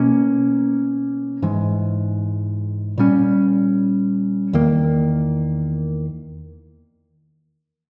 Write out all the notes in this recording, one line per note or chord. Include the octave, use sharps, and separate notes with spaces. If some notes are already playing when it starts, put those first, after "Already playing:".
Already playing: B2 A#3 C#4
G#2 E3 G#3
A#2 G3 C#4
E2 D#3 A#3